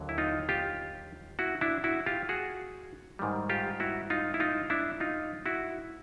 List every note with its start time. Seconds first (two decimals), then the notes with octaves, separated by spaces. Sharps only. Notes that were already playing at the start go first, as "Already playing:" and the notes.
Already playing: D#2 D3 F#3
0.09 E4
0.18 D#4 F4
0.49 F4 G4
1.39 E4 F#4
1.61 D4 E4
1.84 E4 F#4
2.06 F4 G4
2.29 F#4 G#4
3.19 G#2 D#3 G3
3.49 F4 G4
3.80 E4 F#4
4.10 D#4 F4
4.34 E4
4.40 D#4 F4
4.70 D4 E4
5.00 D#4 F4
5.46 E4 F#4